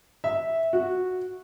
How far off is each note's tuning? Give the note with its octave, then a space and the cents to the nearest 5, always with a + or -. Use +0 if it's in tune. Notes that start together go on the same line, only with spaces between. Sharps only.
E5 -10
F#4 -10